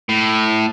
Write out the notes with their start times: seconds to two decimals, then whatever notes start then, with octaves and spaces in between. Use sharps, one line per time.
0.09 A2